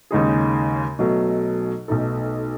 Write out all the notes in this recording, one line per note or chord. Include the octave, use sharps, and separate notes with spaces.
D#2 C#3 G#3 D#4 G#4
B1 B2 F#3 A3
B1 B2 A3 D#4 A4